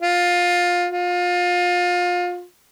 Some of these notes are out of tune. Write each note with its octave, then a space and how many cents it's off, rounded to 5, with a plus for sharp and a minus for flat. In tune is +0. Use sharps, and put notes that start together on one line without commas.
F4 +15
F4 +25